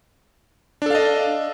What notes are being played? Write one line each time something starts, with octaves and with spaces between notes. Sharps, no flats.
D4 A4 D#5 F5